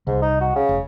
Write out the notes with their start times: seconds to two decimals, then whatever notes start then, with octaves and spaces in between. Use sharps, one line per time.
0.07 C2 G#2
0.22 D#4
0.41 F#4
0.56 C#3
0.69 F1